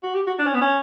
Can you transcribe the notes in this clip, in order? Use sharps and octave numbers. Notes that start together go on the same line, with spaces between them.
F#4
G4
F#4
D4
C#4
B3
C#4